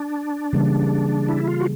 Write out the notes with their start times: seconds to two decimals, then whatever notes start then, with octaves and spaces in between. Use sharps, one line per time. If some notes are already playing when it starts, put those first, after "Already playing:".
Already playing: D4
0.53 C#3 E3 G3 A#3
1.28 E4
1.47 F4
1.61 F#4